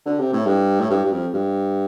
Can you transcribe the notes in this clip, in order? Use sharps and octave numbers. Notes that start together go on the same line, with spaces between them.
D3
C3
A2
G2
A2
G2
G2
F2
G2